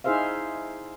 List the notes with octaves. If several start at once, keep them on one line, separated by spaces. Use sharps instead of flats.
D#4 E4 G#4 C5 E5 F5